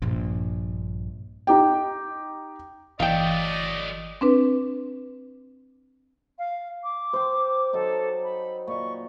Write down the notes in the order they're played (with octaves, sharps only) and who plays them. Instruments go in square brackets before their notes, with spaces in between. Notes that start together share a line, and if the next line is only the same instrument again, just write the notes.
[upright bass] A#1 G2
[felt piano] D#4 G4 G5
[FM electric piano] G1 E3 [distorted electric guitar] F#3 A3 [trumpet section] D5 D#5 [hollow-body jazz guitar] F5 G5
[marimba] C4 D4 B4
[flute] F5
D6
[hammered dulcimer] C5 G5
[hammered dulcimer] F#3 D#4 [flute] A4
[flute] B5
[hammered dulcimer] A#2 D#5 [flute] C#6